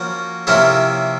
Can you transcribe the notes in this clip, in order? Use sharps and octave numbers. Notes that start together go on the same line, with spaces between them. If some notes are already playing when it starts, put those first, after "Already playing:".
Already playing: F3 A#3 C#4 F#4
C3 F3 A#3 C#4 E4